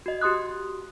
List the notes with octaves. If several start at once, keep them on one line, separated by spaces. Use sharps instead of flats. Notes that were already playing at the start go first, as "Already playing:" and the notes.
F#4 D#5
F#4 G4 C6 D#6 F#6